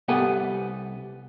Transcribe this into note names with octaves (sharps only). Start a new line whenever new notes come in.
C2 B3 G4 A4 B4 G#5